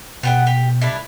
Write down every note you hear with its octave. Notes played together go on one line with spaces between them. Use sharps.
B2 B3 G4 F#5
G4
G3 D4 E4